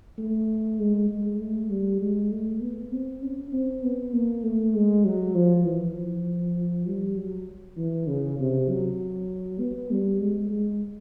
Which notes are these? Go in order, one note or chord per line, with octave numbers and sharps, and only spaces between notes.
A3
G#3
G#3
A3
G3
G#3
A3
B3
C4
C#4
C4
B3
A#3
A3
G#3
F#3
F3
E3
F3
G3
F#3
E3
C#3
C3
F#3
B3
G3
G#3
G#3